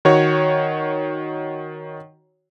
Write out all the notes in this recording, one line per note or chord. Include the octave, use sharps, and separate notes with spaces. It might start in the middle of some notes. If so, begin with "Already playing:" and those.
D#3 F#4 C#5